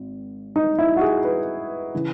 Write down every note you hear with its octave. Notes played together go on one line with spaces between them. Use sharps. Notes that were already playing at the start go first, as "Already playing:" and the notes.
Already playing: G#1
D#4
E4
F#4
G#4
B4
C#3 E3